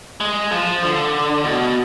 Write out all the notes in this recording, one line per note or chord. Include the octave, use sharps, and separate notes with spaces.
G#3
F3
D3
B2